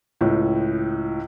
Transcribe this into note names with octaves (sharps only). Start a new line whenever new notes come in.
C#2 A2